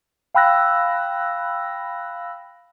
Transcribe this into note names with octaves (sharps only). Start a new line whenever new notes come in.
F5 G5 B5 E6 F#6 A#6